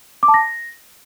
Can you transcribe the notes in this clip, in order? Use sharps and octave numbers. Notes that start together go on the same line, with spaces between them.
D6
A5
A#6